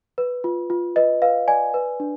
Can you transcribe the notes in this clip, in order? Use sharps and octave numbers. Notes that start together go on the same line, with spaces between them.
B4
F4
F4
B4 D#5
B4 F5
D5 G#5
B4
D4